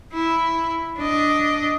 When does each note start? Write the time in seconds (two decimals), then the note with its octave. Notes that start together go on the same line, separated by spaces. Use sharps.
0.13 E4
0.98 D4 D#5